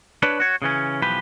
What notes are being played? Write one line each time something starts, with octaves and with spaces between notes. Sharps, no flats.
D4 B4 C#5 A5 B5
F#4 C#5
C#3 E3 C#4
B1 E3 F3 G4 B4 B5